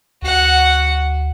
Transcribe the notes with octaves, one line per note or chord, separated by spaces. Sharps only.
D2 F#4 F#5